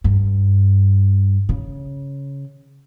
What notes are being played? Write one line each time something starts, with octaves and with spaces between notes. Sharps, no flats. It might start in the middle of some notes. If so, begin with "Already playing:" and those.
G2
C#3